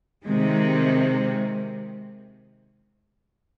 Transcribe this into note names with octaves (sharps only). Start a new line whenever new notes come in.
C3 D#3 G#3